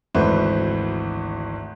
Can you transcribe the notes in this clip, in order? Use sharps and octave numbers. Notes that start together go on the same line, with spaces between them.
G#1 D2 E3 B4 C5 E5